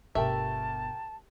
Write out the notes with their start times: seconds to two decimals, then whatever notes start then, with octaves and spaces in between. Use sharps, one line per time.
0.15 G1 B2 A3 G4 A#4 E5 G5 A5